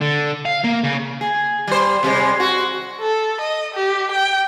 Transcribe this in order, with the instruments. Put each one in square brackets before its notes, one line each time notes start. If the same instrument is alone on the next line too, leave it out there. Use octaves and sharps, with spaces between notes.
[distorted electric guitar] D3
F5
A#3
C#3
[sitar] G#4
G3 C5
C3 G3 G#3
F#4
[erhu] A4
D#5
G4
G5